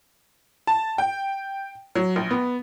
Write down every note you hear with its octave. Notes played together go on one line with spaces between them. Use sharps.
A5
G5
F#3
A#1
B3